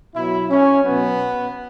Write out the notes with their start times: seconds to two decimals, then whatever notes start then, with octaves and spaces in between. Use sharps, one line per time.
0.15 B2 F#3 E4
0.50 C#4
0.84 B2 F#3 B3